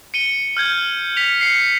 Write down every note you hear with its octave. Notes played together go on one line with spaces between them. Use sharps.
C#7 D#7 G7
F6 G6 G#6
B6 C#7 F7
C7 C#7